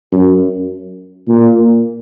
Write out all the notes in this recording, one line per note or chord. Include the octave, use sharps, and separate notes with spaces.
F#2
A#2